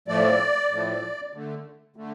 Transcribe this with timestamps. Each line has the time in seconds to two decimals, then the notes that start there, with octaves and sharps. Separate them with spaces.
0.08 A2 F3 A3 D5
0.71 A2 F3 A3
1.33 D3 A3
1.96 D3 A3